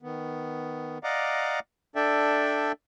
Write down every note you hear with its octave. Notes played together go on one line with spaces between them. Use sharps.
D#3 B3
D5 D#5 F5 F#5 A#5 D6
D4 A4 D5 E5 G5